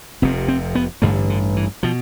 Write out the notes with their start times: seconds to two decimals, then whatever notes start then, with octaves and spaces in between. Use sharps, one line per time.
0.22 F1 F2 C3 C4
0.48 C4
0.75 B3
1.02 A1 G2 D3 A3
1.30 D3
1.57 E3
1.83 B2 F3